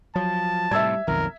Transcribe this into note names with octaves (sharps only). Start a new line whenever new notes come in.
F3 F#3 A5
A2 C3 G3 E5 E6 G#6
B1 F2 D#3 A#4